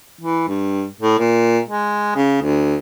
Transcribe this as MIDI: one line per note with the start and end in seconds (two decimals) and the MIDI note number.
0.21 0.48 52
0.48 0.86 43
1.00 1.18 45
1.19 1.59 46
1.67 2.12 56
2.16 2.41 49
2.42 2.76 38